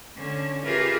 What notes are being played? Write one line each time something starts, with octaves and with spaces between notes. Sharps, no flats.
D3 C#4
F4 G4 G#4 A#4 B4 E5